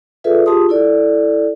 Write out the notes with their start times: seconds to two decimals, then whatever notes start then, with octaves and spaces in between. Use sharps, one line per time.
0.24 F4 G#4 A4 B4 D5 E5
0.46 F4 G4 G#4 A5 C6 D#6
0.69 E4 A4 D5